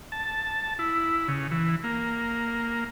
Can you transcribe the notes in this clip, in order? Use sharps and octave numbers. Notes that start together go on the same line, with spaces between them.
A5
E4
C#3
E3
A#3